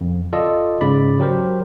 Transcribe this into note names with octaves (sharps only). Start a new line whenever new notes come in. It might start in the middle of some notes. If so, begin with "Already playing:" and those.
F2
F4 A4 D5 D#5
G#2 C#3 D5 B5
F#3 G4 A#4 C5